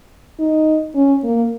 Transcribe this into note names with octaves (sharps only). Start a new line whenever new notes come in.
D#4
C#4
A#3